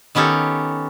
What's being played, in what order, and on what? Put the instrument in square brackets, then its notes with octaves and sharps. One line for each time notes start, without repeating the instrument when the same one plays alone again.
[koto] D#3 B3 C#4 G4 A4